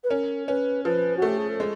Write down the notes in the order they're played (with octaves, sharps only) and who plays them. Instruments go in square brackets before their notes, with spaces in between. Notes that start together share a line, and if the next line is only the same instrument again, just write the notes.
[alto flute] B4
[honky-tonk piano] C#4 [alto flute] A#4
[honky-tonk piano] C#4 [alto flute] B4
[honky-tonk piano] F3 [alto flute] B4
[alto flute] F#4
[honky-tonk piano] A3
[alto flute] G4
G#4
A4
[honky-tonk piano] G#3